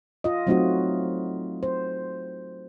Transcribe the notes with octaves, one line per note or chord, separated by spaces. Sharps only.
F4 D#5
F#3 A3 C4 D#4 F4 F#4
C5